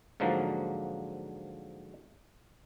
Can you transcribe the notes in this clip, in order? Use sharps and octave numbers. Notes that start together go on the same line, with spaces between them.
G#2 D3 F3 F#3 A#3